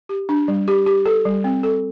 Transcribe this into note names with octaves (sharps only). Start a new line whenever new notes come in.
G4
D4
G3
G4
G4
A4
G3
C4
A4